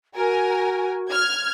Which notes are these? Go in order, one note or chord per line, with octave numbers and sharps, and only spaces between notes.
F#4 A#4 G#5
F6 G#6